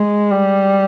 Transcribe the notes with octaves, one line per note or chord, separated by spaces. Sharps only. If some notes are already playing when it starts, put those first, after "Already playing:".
Already playing: G#3
G3